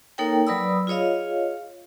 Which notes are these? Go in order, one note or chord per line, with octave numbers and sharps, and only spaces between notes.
A#3 D#4 A4 A#4 C#5 G5
F#3 B4 D5 B5 D#6 E6
F4 G#4 C#5 D#5 F5